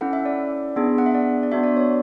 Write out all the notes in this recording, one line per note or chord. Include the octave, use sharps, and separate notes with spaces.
C#4 E4 A4 F#5
E5
D5
B3 D4 G#4
F#5
E5
D5
D5
B3 D4 F#4 E5
D5
C#5